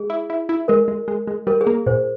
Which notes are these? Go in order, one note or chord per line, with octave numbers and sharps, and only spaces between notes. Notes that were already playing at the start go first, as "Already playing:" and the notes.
Already playing: G#3 G#4
E4
E4
E4
G#3 A#4
G#3
G#3
G#3
G3 A#4
G#4
A#3
A#2 C5